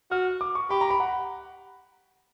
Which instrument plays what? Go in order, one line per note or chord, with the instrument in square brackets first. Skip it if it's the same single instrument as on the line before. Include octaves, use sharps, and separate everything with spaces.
[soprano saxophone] F#4 [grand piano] F6
[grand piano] D6
C#6
[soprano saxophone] G4 [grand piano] B5
[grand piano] A#5
B5
F#5